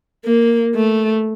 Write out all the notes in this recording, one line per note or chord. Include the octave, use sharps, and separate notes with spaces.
A#3
A3